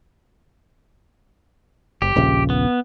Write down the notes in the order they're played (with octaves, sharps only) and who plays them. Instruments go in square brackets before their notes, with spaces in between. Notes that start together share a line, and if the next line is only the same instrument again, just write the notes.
[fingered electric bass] F#1 [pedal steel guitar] G4
[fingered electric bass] D#1 A#1 C#3
[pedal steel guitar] B3